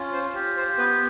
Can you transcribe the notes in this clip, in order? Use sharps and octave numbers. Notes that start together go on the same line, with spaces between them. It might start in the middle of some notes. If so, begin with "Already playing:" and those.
Already playing: C#4 F4
C5
G4
C5
B3 B4